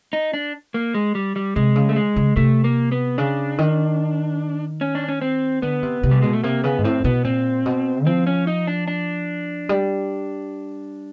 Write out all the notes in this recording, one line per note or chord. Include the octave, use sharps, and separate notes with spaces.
D#4
D4
A#3
G#3
G3
G3
C3 G#3
C#3
A3
G#3
C#3
C3 A3
A#3
B3
C#3 D4
D#3
C#4
D4
C#4
C4
D3 B3
C3
C3
G3
B2 G#3
A3
C3 A#3
C#3 B3
G#2
A2 C4
B2 B3
A#2 C4
B2
F3 C4
C#4
D#4
D4
D4
G3